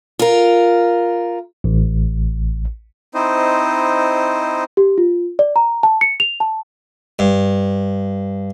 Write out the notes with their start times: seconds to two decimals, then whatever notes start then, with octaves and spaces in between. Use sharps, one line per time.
0.19 F4 A#4
1.64 A1
3.14 C4 D#4 E4 C5 D#5
4.77 G4
4.98 F4
5.39 D5
5.56 A#5
5.83 A5
6.01 C#7
6.20 F7
6.40 A5
7.19 G2